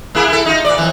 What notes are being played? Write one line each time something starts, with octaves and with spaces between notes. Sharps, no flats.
A#3 E4 G#4
E4 A4
D#4 F4
A#2 D5
F2 E3